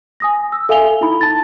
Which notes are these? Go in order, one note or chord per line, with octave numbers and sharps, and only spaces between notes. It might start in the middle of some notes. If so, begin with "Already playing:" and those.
G#5 D#6 A#6
E6
A4 E5 F5 G#5 F7 G7
D#4 E4 B5
A5 A6